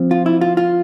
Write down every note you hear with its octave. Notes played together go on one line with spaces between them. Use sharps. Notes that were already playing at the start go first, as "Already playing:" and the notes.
Already playing: F3 C4
F4
E4
F4
F4